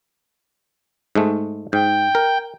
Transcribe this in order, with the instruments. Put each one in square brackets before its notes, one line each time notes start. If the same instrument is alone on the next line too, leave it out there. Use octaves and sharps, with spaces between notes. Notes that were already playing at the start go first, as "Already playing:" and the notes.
[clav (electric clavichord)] G#2 G#3 A3
[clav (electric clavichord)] G#2 [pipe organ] G5
[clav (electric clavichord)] A#4